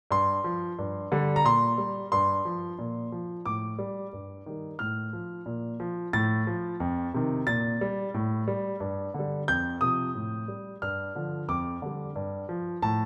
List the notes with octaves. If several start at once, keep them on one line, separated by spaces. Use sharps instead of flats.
G2 C6
F3
G2
D3 G3
A#5
A#2 C6
G3
G2 C6
F3
A#2
F3
A2 D6
G3
G2
D#3 G3
A2 F6
F3
A#2
F3
A2 A6
F3
F2
C3 D#3
A#2 A6
G3
A2
G3
G2
D3 G3
F2 G6
C3 F3 D#6
A2
G3
G2 F6
D3 F3
F2 D6
D3 G3
G2
F3
A2 A5